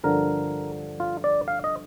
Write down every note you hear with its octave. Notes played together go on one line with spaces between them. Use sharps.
G2 D3 F3 A#4
F4
D5
F5
D#5